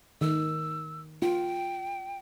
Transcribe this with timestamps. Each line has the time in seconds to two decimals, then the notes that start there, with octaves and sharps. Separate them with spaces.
0.21 D#3 E6
1.22 F4 G5